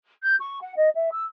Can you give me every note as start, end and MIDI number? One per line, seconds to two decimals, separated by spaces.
0.22 0.36 91
0.40 0.57 85
0.61 0.75 78
0.76 0.89 75
0.95 1.09 76
1.11 1.25 88